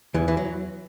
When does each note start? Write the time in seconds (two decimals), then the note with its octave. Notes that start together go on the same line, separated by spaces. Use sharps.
0.14 E2 E3
0.28 E3
0.37 F#3